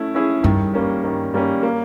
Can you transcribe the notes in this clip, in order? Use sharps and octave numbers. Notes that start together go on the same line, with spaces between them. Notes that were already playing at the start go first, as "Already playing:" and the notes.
Already playing: A3 C#4 E4
C#4 E4 G#4
G2 D#3
G3 A#3 C#4
D#3
G3 A#3 C#4
A#3